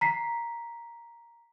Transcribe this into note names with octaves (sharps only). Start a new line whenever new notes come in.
A#5 B6 C7